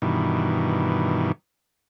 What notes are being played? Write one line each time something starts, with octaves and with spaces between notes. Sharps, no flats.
G2 B2 D#3 E3